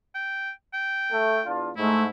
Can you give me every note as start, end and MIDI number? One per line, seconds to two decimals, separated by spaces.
0.15 0.50 79
0.74 1.45 79
1.11 1.38 57
1.45 1.70 40
1.45 1.70 62
1.45 1.70 65
1.77 2.07 44
1.77 2.05 57
1.77 2.09 64